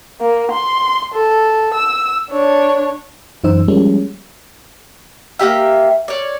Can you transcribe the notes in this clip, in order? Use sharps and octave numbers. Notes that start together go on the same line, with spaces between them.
A#3
C6
A4
E6
D4 C#5
F#2 E3 D#4 C5 E6
F3 G3 G#3 A#3 C#4
A#3 D4 G4 E5
C#5 D5